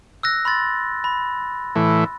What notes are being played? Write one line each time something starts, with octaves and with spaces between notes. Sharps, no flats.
E6 F#6 A#6
B5 C6 A6
B5
A2 E3